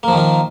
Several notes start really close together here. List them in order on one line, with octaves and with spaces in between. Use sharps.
A#3 F3 D#3 F4